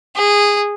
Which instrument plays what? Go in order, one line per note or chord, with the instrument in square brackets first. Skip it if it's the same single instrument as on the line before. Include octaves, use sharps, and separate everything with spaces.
[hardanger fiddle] G#4